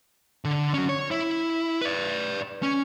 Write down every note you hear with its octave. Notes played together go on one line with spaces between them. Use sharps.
D3
F#3 C#4
C#5
E4
B4 D5
C#4